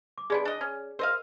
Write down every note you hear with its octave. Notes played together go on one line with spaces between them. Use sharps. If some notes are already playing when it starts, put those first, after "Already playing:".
D6
G#3 B3 D4 G#4 D5 G#5
D4 D#5
C#4
A#4 C5 D#5 F5